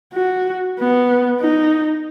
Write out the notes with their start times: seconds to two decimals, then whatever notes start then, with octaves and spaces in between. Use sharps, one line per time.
0.14 F#4
0.79 B3
1.42 D#4